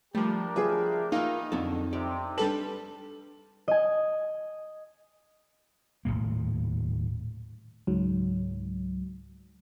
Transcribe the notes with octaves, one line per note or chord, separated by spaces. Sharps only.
F3 G3 A3 D4 G4 A#4
F3 G#4 B4 E5
A#2 D#3 E3 A#3 D#4 F4 F5
F2 D3 F#3 A4
C3 G4 D5
G3 D4 A4 B4 A5 F#7
D#5 G#5
D#1 G#1 A2 A#3
C#2 G#2 F#3